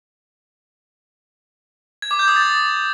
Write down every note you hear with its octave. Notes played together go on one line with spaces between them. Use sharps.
G#6
D6
G6
D#6
A6